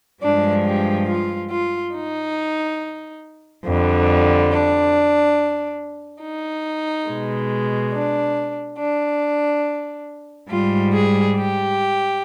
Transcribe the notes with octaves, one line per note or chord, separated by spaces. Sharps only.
G2 F3 G#3 D4
G4
F4
F4
D#4
F2 D3 G3
D4
D#4
B2 G#3
D4
D4
G#2 G3 F4
G#4
G4